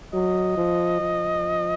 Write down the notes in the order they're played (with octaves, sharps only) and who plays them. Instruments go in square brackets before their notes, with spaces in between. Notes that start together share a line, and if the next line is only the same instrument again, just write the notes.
[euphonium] F#3 [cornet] D#5
[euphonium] F3
F3